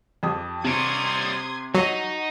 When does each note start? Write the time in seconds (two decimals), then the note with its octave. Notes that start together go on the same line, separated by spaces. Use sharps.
0.23 F2 G4 D#6
0.64 C3 G3 C#5 C6 D#6 G#6 D7
1.75 F#3 D#4 F#4